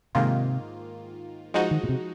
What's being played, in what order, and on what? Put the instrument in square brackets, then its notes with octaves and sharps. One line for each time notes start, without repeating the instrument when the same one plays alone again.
[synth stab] G#2 D#3 A#3 F4 [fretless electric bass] C3
[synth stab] F3 G#3 D#4 F#4
[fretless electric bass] D#3
A#2
C3